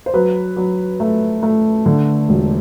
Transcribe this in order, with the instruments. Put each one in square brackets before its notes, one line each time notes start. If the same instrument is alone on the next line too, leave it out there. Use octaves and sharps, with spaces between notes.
[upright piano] C5
F#3 B4
F#3
A3
A3
D3
E1